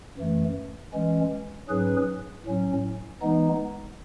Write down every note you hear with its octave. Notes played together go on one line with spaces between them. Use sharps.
F#2 E3 A3
E3 G#3 C#4
G#2 F#3 C#4 G#4 B4
A2 F#3 C#4
E3 G#3 B3 D#4